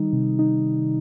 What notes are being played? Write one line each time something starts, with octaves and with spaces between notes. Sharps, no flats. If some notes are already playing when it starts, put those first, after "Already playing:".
Already playing: D#3 G3 D#4
C3
D#4